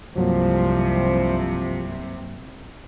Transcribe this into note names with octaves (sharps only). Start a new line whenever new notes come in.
C2 G2 C3 F3 F#3 A#3